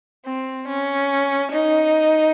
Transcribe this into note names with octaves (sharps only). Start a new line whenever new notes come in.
C4
C#4
D#4